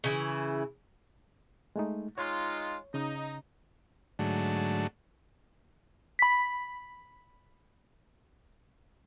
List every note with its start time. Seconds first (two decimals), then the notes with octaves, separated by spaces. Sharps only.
0.04 C#3 E3 E4
1.76 G#3 A3 D#4
2.18 G#3 D#4 F4 C#5
2.94 C#3 D#4
4.19 G#2 D3 F#3 A3
6.19 B5 B6